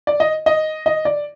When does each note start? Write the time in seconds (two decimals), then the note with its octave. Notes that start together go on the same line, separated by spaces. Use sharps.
0.07 D5
0.20 D#5
0.46 D#5
0.86 D#5
1.05 D5